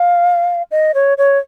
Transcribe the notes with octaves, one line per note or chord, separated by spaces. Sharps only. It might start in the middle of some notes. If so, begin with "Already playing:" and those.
Already playing: F5
D#5
C#5
C#5